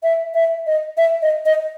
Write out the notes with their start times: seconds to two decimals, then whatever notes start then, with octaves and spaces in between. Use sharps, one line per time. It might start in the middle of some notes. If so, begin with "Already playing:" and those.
0.03 E5
0.34 E5
0.67 D#5
0.97 E5
1.22 D#5
1.46 D#5